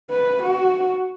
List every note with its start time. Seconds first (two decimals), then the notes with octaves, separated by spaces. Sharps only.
0.10 B4
0.43 F#4